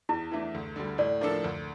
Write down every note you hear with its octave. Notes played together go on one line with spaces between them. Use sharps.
E2 E4
E3 A3 D4
D2
D3 G3
A2 D5
F3 A#3 D4 A4
D2